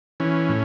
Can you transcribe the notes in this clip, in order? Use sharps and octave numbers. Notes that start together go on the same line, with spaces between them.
E3 C#4
A2